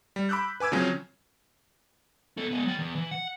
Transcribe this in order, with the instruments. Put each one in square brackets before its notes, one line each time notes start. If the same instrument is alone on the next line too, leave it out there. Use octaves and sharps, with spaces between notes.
[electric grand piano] G3
B5 D6 E6 F#6 G6
B4 G#5 D6 E6 G#6
C#3 F3 F#3 C4 C#4
[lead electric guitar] B3 A4
G#3 B3
F#3 G5
E2
E3
F#5